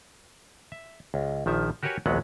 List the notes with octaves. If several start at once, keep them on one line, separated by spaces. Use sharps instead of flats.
E5
C#2
A#1 D#3 F3 E5
F#4 G4 A#4 B4 C#5 G#5
A#1 D#2 F#3 G#3 B3 F#5